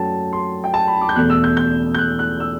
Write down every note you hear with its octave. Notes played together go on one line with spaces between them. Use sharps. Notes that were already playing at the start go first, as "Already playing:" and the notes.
Already playing: F#2 F#3 A3 G5 A5
C6
G5
A5
B5
D6
G6
E2 B2 A3 F#6
E6
G6
G6
G6
F#6
F#6
E6